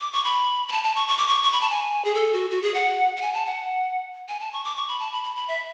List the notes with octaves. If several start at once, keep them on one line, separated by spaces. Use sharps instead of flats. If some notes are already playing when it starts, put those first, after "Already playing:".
D6
C#6
B5
B5
A5
A5
C#6
C#6
D6
C#6
C#6
B5
A5
G#5
G#4
A4
F#4
F#4
G#4
F#5
F#5
G#5
A5
F#5
G#5
A5
C#6
D6
C#6
B5
A5
B5
B5
B5
E5